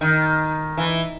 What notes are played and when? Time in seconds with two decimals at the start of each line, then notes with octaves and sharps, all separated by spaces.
0.01 D#3
0.77 E3